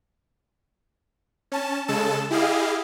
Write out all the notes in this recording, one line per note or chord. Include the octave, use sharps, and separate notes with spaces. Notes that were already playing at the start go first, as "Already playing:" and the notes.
C#4 A5
C#3 G#3 A4 A5 E7
E4 G4 G#4 D#5 F5